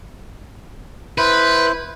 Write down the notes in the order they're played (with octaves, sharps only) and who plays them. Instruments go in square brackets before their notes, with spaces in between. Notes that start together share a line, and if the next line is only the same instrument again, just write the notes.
[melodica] E4 C5 [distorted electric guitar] B4